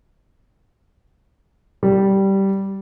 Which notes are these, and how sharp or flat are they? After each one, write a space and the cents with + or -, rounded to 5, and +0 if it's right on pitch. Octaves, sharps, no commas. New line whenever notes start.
G3 -10